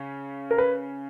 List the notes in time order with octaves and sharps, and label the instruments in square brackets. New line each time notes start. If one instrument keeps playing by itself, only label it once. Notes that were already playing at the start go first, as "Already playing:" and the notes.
Already playing: [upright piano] C#3 C#4
[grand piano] A#4
B4